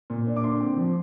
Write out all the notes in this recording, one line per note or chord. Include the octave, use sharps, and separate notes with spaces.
A#2
D4
D6
D3 C6
C4
F3